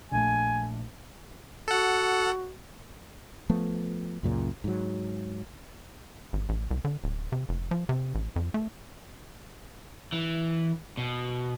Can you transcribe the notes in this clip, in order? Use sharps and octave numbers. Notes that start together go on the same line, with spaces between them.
A#1 A3 G#5
F#4 A4 F#5
F3 A3 B3
C#2 F#2 A#2 C#3
G#2 F#3
G#1
A1
C2
D3
D1
C3
F1
F3
C3
A1
F2
A3
E3
B2